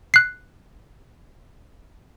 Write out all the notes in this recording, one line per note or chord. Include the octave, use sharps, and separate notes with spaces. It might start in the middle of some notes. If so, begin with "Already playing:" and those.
F#6 C7